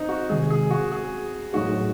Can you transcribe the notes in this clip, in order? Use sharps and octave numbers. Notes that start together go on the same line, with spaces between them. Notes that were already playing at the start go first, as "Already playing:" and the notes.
Already playing: C4 D#4
F#4
C3 D#3 G#3 G#4
G#4
F#4
G#4
A2 F#3 A3 D#4 F#4 G#4